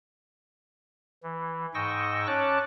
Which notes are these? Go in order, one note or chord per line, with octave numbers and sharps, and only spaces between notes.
E3
G#2 D#5 G5 C#6 E6 A#6
C#4 C#5 A5 D6 F#6